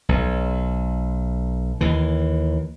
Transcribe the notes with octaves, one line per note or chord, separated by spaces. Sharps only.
B1
D#2 E3